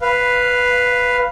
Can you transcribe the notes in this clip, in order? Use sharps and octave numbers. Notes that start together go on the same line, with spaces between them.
B4 F5